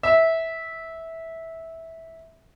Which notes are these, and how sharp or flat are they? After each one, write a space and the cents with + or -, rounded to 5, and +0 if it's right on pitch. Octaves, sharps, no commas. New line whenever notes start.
E5 -15